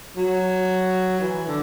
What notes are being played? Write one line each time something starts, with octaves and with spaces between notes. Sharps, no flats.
F#3
E3
D3